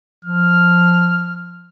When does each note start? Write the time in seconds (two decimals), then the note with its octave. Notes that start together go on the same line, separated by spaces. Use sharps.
0.25 F3 F6